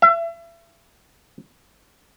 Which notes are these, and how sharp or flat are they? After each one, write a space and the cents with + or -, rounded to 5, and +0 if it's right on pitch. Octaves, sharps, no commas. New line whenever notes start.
E5 +35